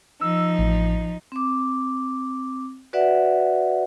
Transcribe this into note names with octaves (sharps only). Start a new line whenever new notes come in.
F3 D#4 E6
A1
C4 D6
F#4 B4 D5 E5 F#5